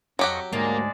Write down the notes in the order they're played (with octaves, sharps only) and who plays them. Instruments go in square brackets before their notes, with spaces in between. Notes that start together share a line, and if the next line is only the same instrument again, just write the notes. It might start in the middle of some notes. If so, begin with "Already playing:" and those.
[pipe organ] F2 D#5 C#6 [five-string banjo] F#3 G4 F#5
[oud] D2 G#2 [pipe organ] G#3 D5 A5 [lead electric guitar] A#3